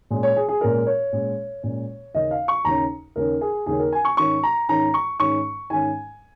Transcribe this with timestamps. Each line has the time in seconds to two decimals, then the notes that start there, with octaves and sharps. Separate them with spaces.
0.10 A#2 G#3 C#4
0.23 C#5
0.36 G#4
0.49 G#4
0.61 A#2 G#3 C#4 A#4
0.87 C#5
1.12 A#2 G#3 C#4
1.63 A#2 G#3 C#4
2.14 D#2 C#3 A#3 C#4 D#5
2.31 F5
2.48 C#6
2.65 D#2 C#3 A#3 C#4 A#5
3.16 D#2 C#3 A#3 C#4 A#4
3.41 G#4
3.66 D#2 C#3 A#3 C#4 G#4
3.79 A#4
3.92 G#5
4.05 C#6
4.17 G#2 D#3 C#4 C#6
4.43 A#5
4.69 G#2 D#3 C#4 A#5
4.94 C#6
5.19 G#2 D#3 C#4 C#6
5.70 G#2 D#3 C#4 G#5